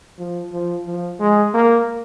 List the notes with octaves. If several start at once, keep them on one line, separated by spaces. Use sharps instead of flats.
F3
F3
F3
G#3
A#3